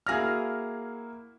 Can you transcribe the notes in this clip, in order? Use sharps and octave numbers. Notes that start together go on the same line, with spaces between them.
A#3 E4 F#4 G#4 F5 F6 A#6